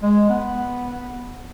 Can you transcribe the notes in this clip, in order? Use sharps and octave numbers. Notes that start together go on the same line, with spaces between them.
G#3
B3